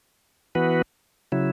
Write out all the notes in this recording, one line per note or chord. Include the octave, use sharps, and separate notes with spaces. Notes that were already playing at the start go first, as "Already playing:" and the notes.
E3 B3 F#4 B4
C#3 F#3 E4